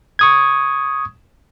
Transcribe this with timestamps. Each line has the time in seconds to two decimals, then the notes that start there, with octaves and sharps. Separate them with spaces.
0.19 C#6 D#6 G#6